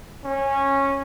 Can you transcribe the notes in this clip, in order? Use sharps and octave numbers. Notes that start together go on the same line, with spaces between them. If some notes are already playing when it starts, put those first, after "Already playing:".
C#4